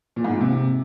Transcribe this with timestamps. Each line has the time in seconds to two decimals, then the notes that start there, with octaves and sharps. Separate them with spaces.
0.16 A#2
0.24 G#2
0.33 A#2
0.41 C3